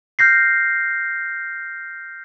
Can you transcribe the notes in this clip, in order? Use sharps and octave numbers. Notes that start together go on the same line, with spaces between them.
F6 G6 A#6 C7